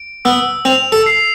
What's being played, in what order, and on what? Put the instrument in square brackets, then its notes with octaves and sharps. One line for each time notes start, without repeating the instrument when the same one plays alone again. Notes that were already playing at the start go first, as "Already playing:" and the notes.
Already playing: [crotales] D7
[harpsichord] B3 [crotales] E6
[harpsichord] C4 [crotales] F7
[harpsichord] A4
[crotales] C7